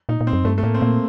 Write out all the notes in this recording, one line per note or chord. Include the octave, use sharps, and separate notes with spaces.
A#2 D#4
A#2
C4
F#2
G2 A3
A3
A2 A#3
C4
A#2 A#3